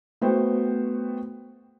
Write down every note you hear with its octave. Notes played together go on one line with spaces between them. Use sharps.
A3 B3 F#4 C5 G5